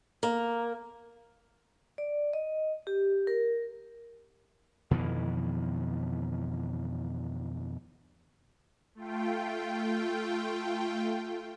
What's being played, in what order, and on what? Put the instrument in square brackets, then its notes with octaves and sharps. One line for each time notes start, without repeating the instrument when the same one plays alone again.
[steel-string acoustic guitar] A#3
[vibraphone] D5
D#5
G4
A#4
[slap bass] F2 B2 D#3 E3
[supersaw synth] A3 F4 G5